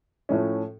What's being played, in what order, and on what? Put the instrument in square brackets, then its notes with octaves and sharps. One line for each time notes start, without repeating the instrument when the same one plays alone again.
[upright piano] A2 F3 A3 C#4